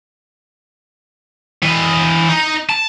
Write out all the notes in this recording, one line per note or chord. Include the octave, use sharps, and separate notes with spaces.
E3 D#5
D#4
A5